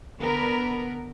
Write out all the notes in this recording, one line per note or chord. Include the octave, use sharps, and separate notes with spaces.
D3 B3 A#4 B4